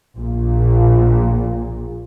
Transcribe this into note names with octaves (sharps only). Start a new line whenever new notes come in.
A#1 A#2